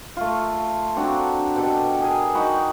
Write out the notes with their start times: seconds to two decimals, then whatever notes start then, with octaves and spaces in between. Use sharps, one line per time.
0.17 A3 F4
0.96 C4 D4 F#4 A#5
1.56 B2 G4 A4
2.00 G#4 A#4 G#5
2.34 D#4 F#4 G5 B5